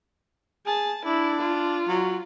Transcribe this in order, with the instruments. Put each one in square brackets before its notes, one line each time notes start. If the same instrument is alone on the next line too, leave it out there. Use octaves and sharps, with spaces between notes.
[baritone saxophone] G#4 [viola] A5
[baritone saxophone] D4 [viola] E4
[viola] F4
[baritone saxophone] F#3